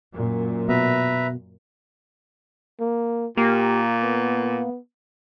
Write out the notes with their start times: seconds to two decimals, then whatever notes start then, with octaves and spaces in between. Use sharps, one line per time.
0.12 F#2 A#2
0.69 B2 B4 E5 A#5
2.80 A#3
3.37 A#2 A#3 G4
4.03 B3